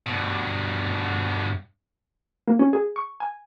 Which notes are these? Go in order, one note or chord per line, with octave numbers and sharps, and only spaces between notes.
G2 B2
A#3
C#4
G#4
C#6
G#5